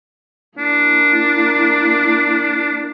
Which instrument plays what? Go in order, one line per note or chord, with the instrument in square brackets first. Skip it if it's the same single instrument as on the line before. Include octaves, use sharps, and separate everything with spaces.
[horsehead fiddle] A#3 E4 [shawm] D4